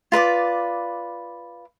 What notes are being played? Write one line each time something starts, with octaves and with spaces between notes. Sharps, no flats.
F4 B4 D5 D6